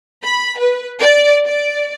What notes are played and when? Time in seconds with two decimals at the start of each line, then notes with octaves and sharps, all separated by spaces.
0.24 B5
0.59 B4
1.00 D5
1.46 D5